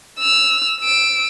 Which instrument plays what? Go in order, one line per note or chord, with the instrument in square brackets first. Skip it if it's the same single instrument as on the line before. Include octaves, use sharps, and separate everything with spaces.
[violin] E6 F6
E6 D7